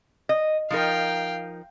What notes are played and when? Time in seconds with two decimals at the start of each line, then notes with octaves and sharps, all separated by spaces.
0.29 D#5
0.70 F3 D#4 A#4 F5 G5